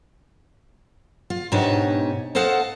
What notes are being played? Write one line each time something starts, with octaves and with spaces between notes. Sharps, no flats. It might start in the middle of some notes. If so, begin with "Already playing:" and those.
F4
G#2 B2 D4 D#4 G4 C#5
A4 C5 D#5 F5 F#5 A5